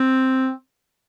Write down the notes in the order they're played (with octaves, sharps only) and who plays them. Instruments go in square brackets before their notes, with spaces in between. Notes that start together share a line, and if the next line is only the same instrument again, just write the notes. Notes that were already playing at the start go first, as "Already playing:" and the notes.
Already playing: [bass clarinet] C4